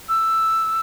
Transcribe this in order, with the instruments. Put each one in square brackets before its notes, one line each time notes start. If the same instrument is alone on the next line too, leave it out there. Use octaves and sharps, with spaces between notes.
[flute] E6